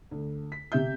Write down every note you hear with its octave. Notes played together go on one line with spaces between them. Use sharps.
D2
B6
C3 G4 E5 G6